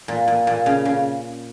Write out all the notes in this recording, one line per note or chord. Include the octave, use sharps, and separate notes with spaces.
A#2
A#2
A#2
C#3
C#3